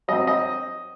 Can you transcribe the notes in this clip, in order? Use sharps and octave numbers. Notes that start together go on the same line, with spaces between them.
F#3 C4 D#5
D#5